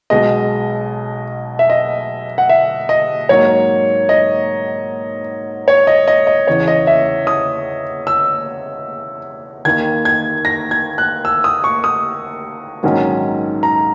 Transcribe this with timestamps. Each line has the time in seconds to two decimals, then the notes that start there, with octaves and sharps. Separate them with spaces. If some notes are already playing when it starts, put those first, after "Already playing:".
0.10 B1 B2 G#3 D#5
1.59 E5
1.70 D#5
2.38 F#5
2.49 E5
2.89 D#5
3.29 G#2 F#3 A#3 D#4 C#5
4.09 D#5
5.68 C#5
5.87 D#5
6.08 D#5
6.27 D#5
6.47 E2 C#3 E3 C#5
6.68 D#5
6.87 E5
7.27 D#6
8.07 E6
9.65 D#2 D#3 A#3 G#6
10.05 G#6
10.45 A#6
10.71 G#6
10.98 F#6
11.25 E6
11.44 D#6
11.64 C#6
11.84 D#6
12.83 A#1 G#2 D#3 F#3 C#4
13.63 A#5